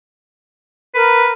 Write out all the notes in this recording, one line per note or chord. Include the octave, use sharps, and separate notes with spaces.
A#4 B4